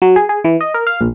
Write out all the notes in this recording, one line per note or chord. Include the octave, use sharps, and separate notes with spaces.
F#3
G#4
G#4
E3
D#5
A#4
F5
A#1